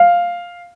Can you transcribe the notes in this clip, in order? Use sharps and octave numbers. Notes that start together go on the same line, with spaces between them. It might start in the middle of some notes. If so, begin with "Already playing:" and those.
Already playing: F5